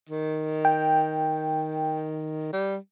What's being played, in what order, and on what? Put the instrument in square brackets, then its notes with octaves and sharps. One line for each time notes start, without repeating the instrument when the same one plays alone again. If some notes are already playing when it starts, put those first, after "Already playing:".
[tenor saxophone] D#3
[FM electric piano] G5
[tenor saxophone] G3